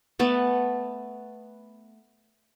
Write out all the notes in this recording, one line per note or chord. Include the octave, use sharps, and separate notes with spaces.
A3 B3 A5